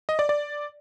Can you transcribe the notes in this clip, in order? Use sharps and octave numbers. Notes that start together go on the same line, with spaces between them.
D#5
D5
D5